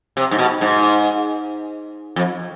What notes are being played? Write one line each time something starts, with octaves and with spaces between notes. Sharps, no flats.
C3
G#2
B2
G#2
F2